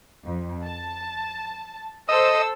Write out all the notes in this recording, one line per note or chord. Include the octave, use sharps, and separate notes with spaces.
F2
A5
A4 C5 D#5 E6